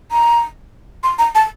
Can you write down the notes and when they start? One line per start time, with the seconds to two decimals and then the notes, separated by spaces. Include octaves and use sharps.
0.12 A#5
1.03 C6
1.19 A#5
1.35 A5